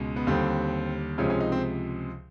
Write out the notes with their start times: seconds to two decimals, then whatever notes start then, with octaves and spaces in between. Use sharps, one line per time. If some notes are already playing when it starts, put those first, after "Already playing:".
Already playing: C#2 B2 G#3
0.16 B3
0.27 D#2 D3 G3 C4
1.18 C#2 C3 F3 G#3 C#4
1.30 C#4
1.41 D#4
1.52 C4